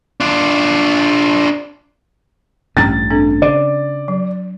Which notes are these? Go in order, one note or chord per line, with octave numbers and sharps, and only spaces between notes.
D4 F4
A1 G2 C#4 G5 A#5 A6
C4 D4 A4
C#3 D5
F#3